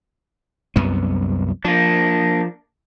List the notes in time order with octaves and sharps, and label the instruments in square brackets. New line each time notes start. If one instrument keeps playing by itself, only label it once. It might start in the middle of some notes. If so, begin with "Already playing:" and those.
[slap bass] C2 F#2 B3
[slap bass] F3 [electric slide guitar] A#3 D4